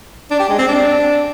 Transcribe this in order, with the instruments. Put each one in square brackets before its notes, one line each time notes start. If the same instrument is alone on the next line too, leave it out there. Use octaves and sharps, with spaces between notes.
[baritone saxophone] D4
G4
G#3
C4
D4